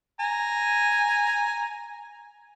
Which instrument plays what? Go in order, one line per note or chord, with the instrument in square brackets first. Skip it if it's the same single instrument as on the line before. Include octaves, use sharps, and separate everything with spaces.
[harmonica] G#5 A#5